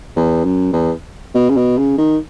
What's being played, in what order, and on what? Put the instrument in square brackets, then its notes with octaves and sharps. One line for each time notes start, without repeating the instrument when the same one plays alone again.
[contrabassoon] E2
F#2
E2
B2
C#3
B2
C#3
D#3